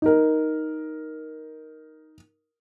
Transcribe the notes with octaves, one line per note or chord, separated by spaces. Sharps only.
D#4 A#4